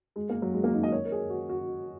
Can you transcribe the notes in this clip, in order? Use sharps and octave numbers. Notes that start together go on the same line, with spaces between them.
G#3
A#3
F#3
G#3
A#3
D#4
D#5
C#5
A#4
G#4
F#4
F#4